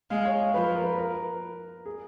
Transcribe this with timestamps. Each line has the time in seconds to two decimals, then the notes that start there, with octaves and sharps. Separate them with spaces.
0.10 G#3 F5
0.25 C#5
0.54 F3 B4
0.76 A#4
0.84 B4
0.99 A#4
1.86 G#4